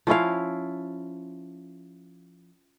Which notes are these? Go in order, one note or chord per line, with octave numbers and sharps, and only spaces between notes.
F3 C#4 E4 F5